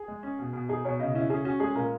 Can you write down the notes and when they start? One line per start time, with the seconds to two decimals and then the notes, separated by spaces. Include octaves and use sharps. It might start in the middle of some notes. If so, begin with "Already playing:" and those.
Already playing: G#4
0.08 G#3
0.23 C#4
0.39 B2
0.53 B2
0.69 D#4 G#4
0.85 B2 C#5
0.99 C#3 D#5
1.14 C#4 E4
1.30 C#4 G#4
1.45 C#4 F#4
1.60 G#3 G#4
1.75 A#2 A#4